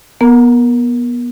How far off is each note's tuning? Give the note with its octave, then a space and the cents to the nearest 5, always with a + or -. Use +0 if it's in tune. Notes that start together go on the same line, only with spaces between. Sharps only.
B3 -25 A#4 +0 A#5 +0